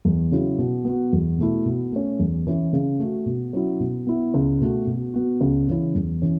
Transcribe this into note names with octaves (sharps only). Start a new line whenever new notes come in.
E2
C#3 F#3 C#4 E4
B2
B3 F#4
E2
B2 A3 E4
B2
A3 C#4
E2
E3 C#4 E4
C#3
A3 F#4
B2
F#3 C#4 E4
B2
B3 E4
C#2
B2 A3 F#4
B2
B3 F#4
C#2
C#3 E3 C#4 E4
E2
E3 C#4